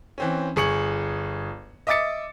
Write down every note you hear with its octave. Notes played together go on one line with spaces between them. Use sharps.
E3 C4 C#4
G1 G#4 C#6 C#7 F#7
D#5 E5 D6 D#6 A6 C#7